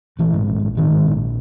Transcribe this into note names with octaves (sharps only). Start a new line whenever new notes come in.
A#1 E3
G#2
A#1
A#1
G#2 D#3
G#2
A#1